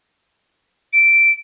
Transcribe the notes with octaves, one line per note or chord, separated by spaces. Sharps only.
D7